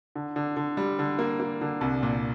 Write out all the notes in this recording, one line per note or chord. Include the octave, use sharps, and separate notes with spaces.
D3
D3
D3
G3
D3
A#3
A#3
D3
C2
A#2